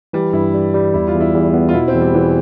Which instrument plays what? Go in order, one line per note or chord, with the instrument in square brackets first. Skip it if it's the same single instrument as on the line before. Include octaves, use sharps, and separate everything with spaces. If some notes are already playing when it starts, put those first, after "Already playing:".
[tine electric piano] E3 [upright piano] G3
[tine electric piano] G2 [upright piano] E4
[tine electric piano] G3
G3
[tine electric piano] E2 [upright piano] E4
[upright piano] F4
[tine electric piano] E2
[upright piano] E4
[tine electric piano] E2
B3
[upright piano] F4
[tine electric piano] B2 [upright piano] E4
[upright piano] C4
[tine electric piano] E2
[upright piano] G3
[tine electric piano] E2 [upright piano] E3